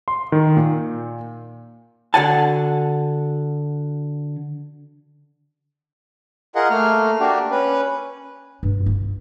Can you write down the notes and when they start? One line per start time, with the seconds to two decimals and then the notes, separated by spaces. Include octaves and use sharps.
0.08 C6
0.32 D#3
0.57 A#2
2.14 D3 F#4 D5 F#5 G#5 A5
6.55 F4 G#4 A#4 D#5 F#5
6.70 A3 A#3 F6
7.20 A#3 D4 F#4 G4
7.51 C#4 B4
8.63 G2
8.86 F4